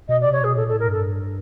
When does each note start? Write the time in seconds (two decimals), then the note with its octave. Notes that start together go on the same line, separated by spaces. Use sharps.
0.09 B2 D#5
0.21 D5
0.25 C3
0.33 C#5
0.41 B2 G#4
0.56 A#2 A4
0.68 A4
0.72 A2
0.80 A#4
0.88 G2 A4